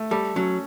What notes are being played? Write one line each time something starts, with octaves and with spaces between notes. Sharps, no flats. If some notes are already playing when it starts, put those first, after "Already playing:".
Already playing: A3
G3 A4
F#3 C#4